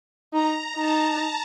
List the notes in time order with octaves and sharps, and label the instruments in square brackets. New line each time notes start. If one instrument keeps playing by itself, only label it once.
[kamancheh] D#4 [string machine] A#5
[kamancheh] D#4 [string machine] A5